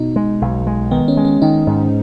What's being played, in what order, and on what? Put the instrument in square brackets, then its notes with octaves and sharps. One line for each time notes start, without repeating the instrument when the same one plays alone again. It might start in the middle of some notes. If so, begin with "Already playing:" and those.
Already playing: [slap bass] B2 [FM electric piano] D#4
[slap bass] G#3
B1
G#3
[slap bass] D#3 [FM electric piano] B3
[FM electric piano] C#4
[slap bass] G#3
[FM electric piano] C#4
[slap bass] D#3 [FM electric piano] D#4
[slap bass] G#2